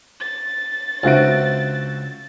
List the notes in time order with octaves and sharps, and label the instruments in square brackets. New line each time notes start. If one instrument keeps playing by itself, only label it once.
[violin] A6
[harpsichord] C#2 [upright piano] C4 F#4 D7 [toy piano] D4 E5 A#5